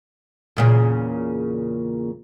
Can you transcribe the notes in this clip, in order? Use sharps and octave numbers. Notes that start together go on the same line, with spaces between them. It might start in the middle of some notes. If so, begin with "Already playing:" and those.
E2 A#2 C#3